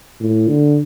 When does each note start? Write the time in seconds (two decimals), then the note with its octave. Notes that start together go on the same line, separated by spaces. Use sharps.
0.20 A2
0.48 D3